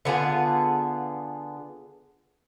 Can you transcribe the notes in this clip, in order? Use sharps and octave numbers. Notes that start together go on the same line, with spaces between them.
D3 B3 F4 G#4